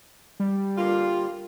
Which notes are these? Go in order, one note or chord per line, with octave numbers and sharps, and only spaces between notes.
G3
D3 A#3 F4